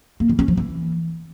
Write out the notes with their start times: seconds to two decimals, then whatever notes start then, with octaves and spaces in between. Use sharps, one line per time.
0.20 A#3
0.29 E3
0.39 C#4
0.48 F3
0.57 E3